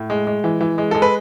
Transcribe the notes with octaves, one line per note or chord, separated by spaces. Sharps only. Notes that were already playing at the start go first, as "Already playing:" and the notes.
Already playing: A2
G#3
G#3
E3
E3
G#3
G#3 A4
B4